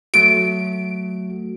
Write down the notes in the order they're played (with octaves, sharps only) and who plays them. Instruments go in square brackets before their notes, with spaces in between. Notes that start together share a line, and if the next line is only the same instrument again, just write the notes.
[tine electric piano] F#3 A3 F#4 [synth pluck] D7